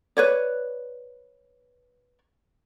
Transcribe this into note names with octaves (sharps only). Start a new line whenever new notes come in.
B4 C#5 D5